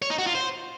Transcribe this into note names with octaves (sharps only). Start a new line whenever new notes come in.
C#5
D#4
F#4
F4
C5